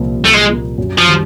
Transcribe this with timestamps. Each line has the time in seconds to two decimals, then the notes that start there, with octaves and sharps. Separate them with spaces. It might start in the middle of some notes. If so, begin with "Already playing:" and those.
Already playing: C2 A#2 F3 A#3
0.19 C2
0.26 A3
0.34 G#3
0.49 A#2 F3 A#3
0.78 F#2
0.98 F3
1.07 D#3 G3